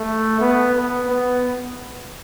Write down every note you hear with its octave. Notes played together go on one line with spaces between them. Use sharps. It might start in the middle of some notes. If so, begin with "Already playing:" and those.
Already playing: A3
B3
B3
B3